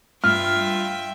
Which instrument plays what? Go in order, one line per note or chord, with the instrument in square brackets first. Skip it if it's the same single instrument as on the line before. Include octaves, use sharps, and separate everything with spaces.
[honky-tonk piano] G2 [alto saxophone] F4 [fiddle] E5 G5 [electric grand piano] F6